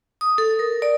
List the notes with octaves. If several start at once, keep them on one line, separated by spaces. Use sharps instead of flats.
D#6
A4
A#4
D5